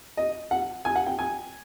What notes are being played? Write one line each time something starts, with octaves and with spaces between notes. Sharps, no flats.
D#5
F#5
G#5
F#5
G5
G#5